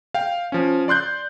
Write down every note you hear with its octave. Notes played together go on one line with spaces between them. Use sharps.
F5 G5
F3 C#4
D5 C6 F#6 G6